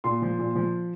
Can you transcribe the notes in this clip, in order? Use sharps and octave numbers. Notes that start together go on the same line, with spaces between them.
A#2 C6
F3
A#2
F3